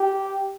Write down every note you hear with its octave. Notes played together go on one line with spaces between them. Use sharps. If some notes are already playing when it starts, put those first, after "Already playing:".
Already playing: G4